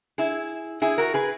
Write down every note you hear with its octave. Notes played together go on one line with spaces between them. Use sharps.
E4 G#4
E4 G#4
F#4 A#4
G#4 B4